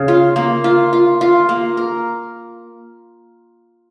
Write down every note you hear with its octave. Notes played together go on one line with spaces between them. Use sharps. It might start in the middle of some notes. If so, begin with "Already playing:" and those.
Already playing: C#3
F4
A#3
F4
F4
F4
A#3
A#4